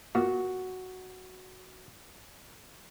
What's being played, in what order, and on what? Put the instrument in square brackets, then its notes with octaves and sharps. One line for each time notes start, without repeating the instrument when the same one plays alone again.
[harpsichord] A#2 [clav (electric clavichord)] F#4